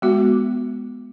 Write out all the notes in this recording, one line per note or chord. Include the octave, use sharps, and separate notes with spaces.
G#3 B3 F#4